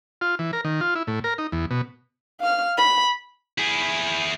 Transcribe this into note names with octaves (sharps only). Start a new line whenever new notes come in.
F4
E3
A#4
D#3
F4
E4
A2
A#4
D#4
E2
B2
F5 F6
B5
E4 G#4